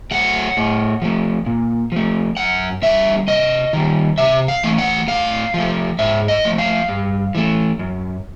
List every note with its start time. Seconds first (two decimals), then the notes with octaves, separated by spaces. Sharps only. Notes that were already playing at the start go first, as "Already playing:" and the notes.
0.11 F#3 A3 F#5
0.57 A2
1.02 F3 A3
1.46 A#2
1.92 F3 A3
2.37 F#2 F#5
2.82 D3 G3 E5
3.27 C3 D#5
3.73 D#3 G3
4.18 C3 E5
4.48 F5
4.63 E3 A3
4.78 F#5
5.08 A2 F5
5.54 F3 A3
5.99 G#2 E5
6.28 D#5
6.44 F3 A3
6.58 F5
6.88 G2
7.35 E3 A3
7.79 F#2